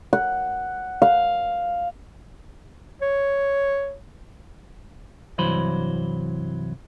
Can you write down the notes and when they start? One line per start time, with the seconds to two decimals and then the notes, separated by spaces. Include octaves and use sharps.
0.13 F#5
1.02 F5
3.02 C#5
5.38 C2 G2 E3 F#3 C5 B5